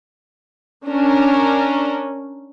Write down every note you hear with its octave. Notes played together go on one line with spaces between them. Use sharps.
C#4 D4 A#4